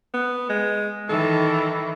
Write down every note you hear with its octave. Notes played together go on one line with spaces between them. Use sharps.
B3
G#3
D#3 E3 A4